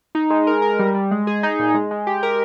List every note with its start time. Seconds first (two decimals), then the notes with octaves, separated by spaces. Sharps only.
0.15 D#4
0.30 G#3
0.47 A#4
0.62 A#4
0.79 G3
0.95 G3
1.11 G#3
1.27 G#4
1.43 D#4
1.59 A#2
1.74 G#3
1.91 G#3
2.07 G4
2.23 A#4